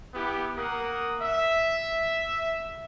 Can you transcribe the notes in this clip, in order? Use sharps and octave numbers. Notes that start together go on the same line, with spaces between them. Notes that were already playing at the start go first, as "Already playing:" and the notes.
B3 E4 G4
A#3 A#4 F#5 D#6
E5